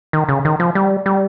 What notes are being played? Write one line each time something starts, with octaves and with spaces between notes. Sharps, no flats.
D#3
C#3
D#3
F3
G3
G3